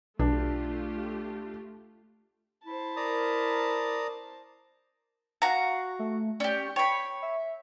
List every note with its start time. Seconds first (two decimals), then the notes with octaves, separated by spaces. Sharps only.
0.19 B1 A3 D4 F4 G4
2.66 E4 C5 A5
2.97 A#4 D5 A#5 D#6
5.42 F#4 F5 A#5
5.99 A3
6.40 C#4 G4 D5
6.76 C#5 G5 B5
7.22 E5